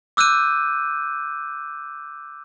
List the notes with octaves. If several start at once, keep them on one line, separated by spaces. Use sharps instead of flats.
D6 E6 F#6 G6 D#7